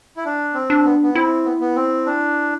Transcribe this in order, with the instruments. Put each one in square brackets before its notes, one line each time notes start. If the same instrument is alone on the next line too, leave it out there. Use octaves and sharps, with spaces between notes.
[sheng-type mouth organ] E4
D4
C4
[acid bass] D4
[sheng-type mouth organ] B3
B3
[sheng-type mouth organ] C4 [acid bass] E4
[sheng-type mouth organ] B3
B3
C4
D4